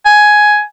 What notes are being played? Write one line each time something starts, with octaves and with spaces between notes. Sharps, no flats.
G#5